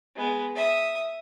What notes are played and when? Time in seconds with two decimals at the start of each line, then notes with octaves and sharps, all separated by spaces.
0.15 G#3 B3
0.55 E5 D#6